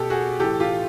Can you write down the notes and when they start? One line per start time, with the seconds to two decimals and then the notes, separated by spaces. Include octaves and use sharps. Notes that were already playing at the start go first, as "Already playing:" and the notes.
Already playing: B2 G4 A4
0.10 F#4 G#4
0.40 A2 E3 G4 A4
0.60 F4 G4